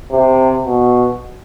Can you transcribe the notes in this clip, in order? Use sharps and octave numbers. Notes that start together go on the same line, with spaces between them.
C3
B2